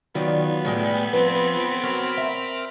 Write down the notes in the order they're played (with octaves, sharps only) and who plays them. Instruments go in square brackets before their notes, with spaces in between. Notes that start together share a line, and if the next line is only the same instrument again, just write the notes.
[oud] D#3 D#4 D5 [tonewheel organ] F#3 F4 [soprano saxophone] B3
[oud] A2 G3 G#3
[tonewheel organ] F3 [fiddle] C4 [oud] B4
[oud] F#3 [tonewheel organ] A#4 B5 F6
[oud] E5